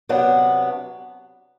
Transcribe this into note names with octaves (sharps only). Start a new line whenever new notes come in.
C3 F#3 B3 D4 F#5